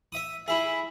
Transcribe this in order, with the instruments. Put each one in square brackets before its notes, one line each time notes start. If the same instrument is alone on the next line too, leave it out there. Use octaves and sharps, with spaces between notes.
[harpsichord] E5 D#6
[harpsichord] E4 G#4 [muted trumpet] E5